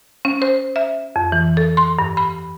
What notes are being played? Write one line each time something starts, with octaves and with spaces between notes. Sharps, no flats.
C#4
C5
E5
F2
E3
A4
C6
G2
B5